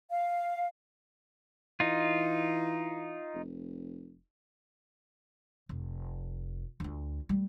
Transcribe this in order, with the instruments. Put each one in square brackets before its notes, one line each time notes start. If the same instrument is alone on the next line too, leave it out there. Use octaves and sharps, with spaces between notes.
[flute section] F5
[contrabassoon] E3 [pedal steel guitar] D#4 F4
[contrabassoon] F1
[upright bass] F1
D2 F4
G3 A3